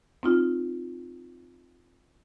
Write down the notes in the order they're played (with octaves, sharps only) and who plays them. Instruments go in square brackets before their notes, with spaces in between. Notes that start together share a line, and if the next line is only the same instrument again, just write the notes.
[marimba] C4 D#4 F4